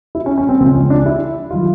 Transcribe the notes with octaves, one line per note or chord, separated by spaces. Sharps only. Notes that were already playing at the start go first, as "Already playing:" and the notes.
E4
C#4
C#4
C4
C#2 C#3 F3 G#3 C4
C#4
D4
E4
D#3 F#3 F4